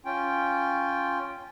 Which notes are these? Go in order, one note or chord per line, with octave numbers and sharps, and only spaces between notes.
C#4 F4 G5